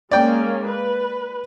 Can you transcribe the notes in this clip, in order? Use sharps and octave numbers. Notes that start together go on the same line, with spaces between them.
G#3 A#3 C#4 D5 G5
B4